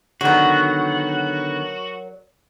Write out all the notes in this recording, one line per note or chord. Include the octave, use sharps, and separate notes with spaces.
D3 D#3 F#3 B3 F#4 A#4